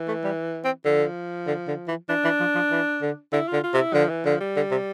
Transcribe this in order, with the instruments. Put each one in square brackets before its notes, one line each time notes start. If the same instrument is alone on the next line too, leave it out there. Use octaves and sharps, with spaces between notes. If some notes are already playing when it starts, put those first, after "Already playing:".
Already playing: [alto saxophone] E3
[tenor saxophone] A3
G3
C4
[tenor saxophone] D3 [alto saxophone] F3
[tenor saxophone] D3
D3
E3
[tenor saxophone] E3 [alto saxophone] D4
[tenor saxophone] E3
F3
F3
E3
D3
[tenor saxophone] D3 [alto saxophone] E4
[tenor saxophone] D3 [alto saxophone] F4
[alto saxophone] F4
[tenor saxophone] C3
[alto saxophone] E4
[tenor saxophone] D3 [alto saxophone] F3
[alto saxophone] E3
[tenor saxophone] D3 [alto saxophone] F3
[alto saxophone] G3
[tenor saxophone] D3
C3